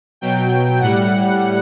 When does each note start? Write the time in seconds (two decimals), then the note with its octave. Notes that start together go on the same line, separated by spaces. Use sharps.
0.21 B2 F#3 G5
0.81 A2 G3 F#5